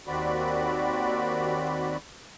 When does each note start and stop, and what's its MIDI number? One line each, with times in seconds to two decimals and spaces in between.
0.07 1.97 39
0.07 1.97 51
0.07 1.97 60
0.07 1.97 66
0.07 1.97 74
0.07 1.97 83